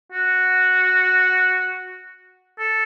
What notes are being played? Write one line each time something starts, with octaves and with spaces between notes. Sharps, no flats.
F#4
A4